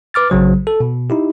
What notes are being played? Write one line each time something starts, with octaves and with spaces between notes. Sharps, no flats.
B4 D6 F6 A6
A#1 C#3 F#3 C5
A4
B2
D#4 E4 G4